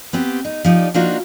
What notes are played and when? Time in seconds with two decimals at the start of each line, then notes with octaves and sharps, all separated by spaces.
0.13 B3 C4 G4
0.45 D#4
0.64 F3 D#4 G4 D5
0.94 F3 A#3 D4 D#4 F4 F#4